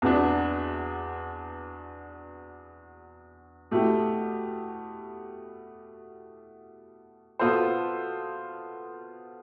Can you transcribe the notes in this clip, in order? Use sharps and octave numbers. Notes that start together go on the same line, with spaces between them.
E2 B2 B3 D4
B2 A3 E4 G4
B2 B3 F4 A4 C5